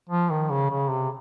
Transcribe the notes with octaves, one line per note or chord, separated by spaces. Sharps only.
F3
D#3
C#3
C#3
C3